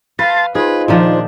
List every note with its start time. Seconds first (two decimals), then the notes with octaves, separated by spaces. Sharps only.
0.19 B4 F5 A5 C6 A6
0.55 D#4 F4 G#4 B4 C5
0.88 A#2 D#3 F3 D4